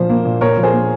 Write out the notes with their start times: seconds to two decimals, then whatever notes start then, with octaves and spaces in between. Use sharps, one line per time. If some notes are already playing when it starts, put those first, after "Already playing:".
Already playing: A#2 F3 C5
0.09 A#3
0.25 A#2
0.41 A#2 A#4 C#5
0.57 F3
0.63 G#4 C5
0.73 A#3